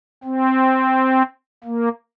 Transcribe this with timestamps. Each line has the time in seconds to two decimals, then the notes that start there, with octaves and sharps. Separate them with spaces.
0.24 C4
1.64 A#3